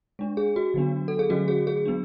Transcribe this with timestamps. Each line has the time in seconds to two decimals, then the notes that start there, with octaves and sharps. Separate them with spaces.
0.19 G#3 D4
0.37 G#4
0.56 F#4
0.74 D3 F#3 B3 D4
1.08 A4
1.19 G#4
1.30 D3 F#3 A3 C#4 F#4
1.48 G#4
1.67 G#4
1.85 F#3 B3 D4